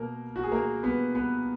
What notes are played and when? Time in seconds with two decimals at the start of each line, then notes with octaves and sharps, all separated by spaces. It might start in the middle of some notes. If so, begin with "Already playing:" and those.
Already playing: B2 A#3 A#4
0.36 F#4
0.43 G#4
0.51 A#3 A#4
0.83 B3 B4
1.15 B3 B4